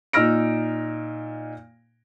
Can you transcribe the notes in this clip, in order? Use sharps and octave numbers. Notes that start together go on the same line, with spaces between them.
A#2 D#4 E6 F6 A#6 D7